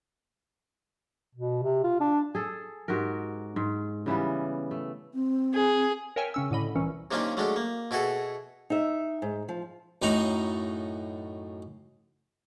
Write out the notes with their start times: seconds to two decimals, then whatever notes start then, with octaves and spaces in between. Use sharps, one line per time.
1.35 B2
1.63 C3
1.84 F4
2.01 D4
2.35 G#4 A4
2.88 G#2 F#4 G4 A#4
3.56 G#2
4.06 C#3 E3 G3 B3
4.71 A3
5.14 C4
5.54 G#4
6.16 A#4 C#5 E5 G5 G#5 F6
6.34 C#3 C#4 E6
6.51 A2 D3 D#5 B5
6.75 C2 A#2 E3 C#4
7.11 C3 D#3 A#3 C#4 D4 F4
7.37 F#3 G#3 A3 C#4 D4
7.56 A#3
7.91 B2 E4 F#4 G#4 A4
8.70 D#4 E5
9.22 G#2
9.49 F3
10.02 F#2 A2 D#4 F#4 A#5